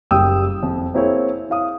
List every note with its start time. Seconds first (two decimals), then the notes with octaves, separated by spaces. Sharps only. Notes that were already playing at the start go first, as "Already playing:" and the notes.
0.11 F#1 G3 G5 D#6 E6
0.63 F2
0.94 A#3 C4 E4 G#4 C#5
1.50 E4 F5 D#6